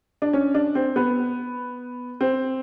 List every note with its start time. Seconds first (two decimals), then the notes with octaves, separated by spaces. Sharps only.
0.22 D4
0.33 C#4
0.54 D4
0.75 C4
0.96 B3
2.21 C4